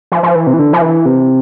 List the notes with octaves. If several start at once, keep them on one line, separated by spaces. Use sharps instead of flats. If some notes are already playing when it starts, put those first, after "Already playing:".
F3
F3
E3
C3
E3
D3
F3
E3
C3